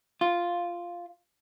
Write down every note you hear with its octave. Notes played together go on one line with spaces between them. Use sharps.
F4